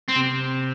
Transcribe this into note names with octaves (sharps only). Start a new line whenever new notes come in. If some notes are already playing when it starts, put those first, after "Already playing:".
C4
C3